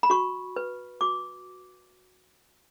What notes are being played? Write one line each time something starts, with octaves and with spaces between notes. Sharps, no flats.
B5
F#4 C#6
B4
F#4 D6